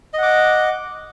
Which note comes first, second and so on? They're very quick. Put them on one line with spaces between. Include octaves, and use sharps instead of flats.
D#5 F#5 D6